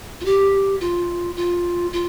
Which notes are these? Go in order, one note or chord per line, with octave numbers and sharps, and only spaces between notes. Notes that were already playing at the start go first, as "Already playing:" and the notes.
F4
G4
F4
F4
F4